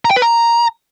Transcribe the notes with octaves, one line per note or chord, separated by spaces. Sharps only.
A#5
G5
B4
A#5